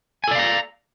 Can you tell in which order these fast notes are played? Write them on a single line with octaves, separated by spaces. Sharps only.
G#5 A4 D5 F5 A#5